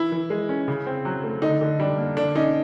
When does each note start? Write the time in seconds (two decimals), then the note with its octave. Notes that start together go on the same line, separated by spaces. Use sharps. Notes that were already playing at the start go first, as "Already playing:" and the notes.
Already playing: E3 E4
0.12 E3
0.30 G#3
0.49 C#4
0.68 C#3
0.86 C4
1.05 F#3
1.24 A3
1.42 D3 D#4
1.61 D3
1.80 G3 D4
1.98 A#3
2.17 D3 D4
2.35 C#4 D#4